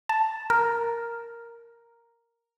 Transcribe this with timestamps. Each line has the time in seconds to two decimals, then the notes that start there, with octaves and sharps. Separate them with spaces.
0.09 A5
0.50 A#4